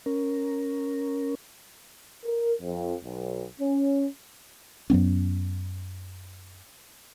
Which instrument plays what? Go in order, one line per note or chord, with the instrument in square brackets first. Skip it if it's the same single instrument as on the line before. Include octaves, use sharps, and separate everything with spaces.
[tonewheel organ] C#4 A#4
[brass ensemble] A#4
F2
B1
C#4
[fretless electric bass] F#2 F#3 B3 C#4